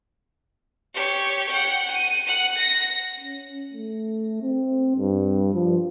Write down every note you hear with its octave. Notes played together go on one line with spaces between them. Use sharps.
G4 C#5
F#5 G5
D#7
F#5 F#6
A#6
C#4
A3
C4
G2
F3